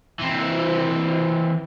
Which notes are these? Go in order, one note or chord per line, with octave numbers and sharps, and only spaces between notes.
E3 C4